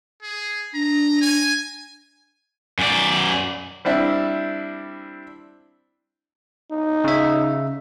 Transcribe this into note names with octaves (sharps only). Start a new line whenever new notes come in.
G#4
D4 A#5
G#5
F#2 D5
G3 C4 D4 E4
D#4
C#3 E5